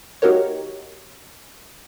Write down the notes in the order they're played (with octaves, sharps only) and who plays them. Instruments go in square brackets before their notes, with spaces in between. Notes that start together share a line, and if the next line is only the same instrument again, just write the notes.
[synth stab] A#3 D#4 F#4 G4 A#4 C#5